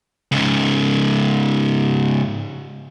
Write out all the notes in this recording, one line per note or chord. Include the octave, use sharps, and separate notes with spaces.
G#2 C#3